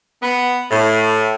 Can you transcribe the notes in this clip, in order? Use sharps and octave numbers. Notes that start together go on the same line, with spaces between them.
B3
A2